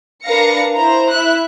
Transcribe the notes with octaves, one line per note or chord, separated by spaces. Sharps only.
D4 A#4 B4 F5 A#6 C#7
E4 C5 A#5
E4 E5 F#6